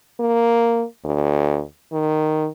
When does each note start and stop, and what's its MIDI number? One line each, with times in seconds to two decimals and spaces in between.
0.20 0.84 58
1.04 1.61 38
1.92 2.48 51